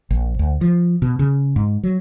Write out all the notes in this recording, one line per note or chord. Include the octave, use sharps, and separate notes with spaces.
A#1
D2
F3
B2
C#3
G#2
F#3